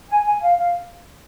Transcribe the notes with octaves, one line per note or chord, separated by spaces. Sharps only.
G#5
G#5
F5
F5